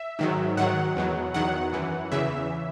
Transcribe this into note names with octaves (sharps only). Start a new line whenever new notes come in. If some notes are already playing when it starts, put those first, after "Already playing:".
Already playing: E5
G#2 D#3 F#3
G#2 D#3 F#3 F#5
E2 B2 F#3
E2 D#3 F#3 F#5
F#2 E3
E2 C#3 E3 E5